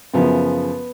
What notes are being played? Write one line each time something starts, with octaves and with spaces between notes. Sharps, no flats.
F#2 C#3 F3 B3